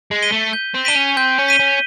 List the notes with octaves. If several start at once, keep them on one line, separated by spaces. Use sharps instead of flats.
G#3
B6 D#7 G7
A3
G6
C4
D4 B6 D#7 G7
C#4
C4 G6
C#4
B6 D#7 G7
C#4